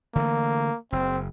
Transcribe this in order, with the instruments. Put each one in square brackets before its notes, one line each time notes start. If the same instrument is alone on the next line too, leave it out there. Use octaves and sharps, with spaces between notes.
[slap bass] D3 E3 A3 [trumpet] A#3
[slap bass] F#1 [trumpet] C4